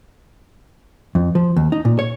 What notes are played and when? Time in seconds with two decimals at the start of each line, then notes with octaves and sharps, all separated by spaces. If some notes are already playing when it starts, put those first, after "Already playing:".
1.15 F2
1.35 F3
1.56 D#2
1.72 D#4
1.85 A#2
1.99 C#5